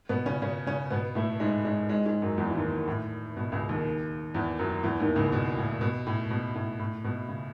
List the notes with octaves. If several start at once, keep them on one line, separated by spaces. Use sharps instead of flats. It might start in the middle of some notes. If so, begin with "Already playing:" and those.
B2 B3
C#3 C#4
C#3 C#4
C#3 C#4
B2 B3
A2 A3
G#2 G#3
G#2 G#3
G#2 G#3
G#2 G#3
F#2 F#3
E2 E3
E3
D#2 D#3
A2
B2
C#2 C#3
D#2 D#3
E2 E3
F#2 F#3
E2 E3
D#2 D#3
C#2 C#3
B2
A2
B2
A2
B2
A2
A2
B2
C#3